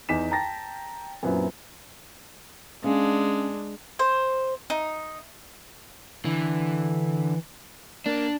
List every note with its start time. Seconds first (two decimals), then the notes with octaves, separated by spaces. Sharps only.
0.09 E2 D#4 B6 E7
0.31 G5 A5 A#5 A6 A#6
1.23 F#2 A#2 F#3 B3 C4 E4
2.84 G#3 B3 C#4 D4 F5
3.99 C5
4.70 D#4
6.25 D3 E3
8.06 A#3 D4